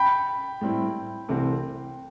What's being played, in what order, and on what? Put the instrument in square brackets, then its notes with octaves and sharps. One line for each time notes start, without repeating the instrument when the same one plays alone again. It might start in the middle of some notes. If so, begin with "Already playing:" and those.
Already playing: [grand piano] G5 B5
[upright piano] A2 G3 C4 E4
C2 C3 E3 A3 C4